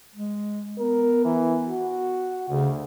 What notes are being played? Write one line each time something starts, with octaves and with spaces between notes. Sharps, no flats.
G#3
B3 A#4
E3
F#4
D2 C#3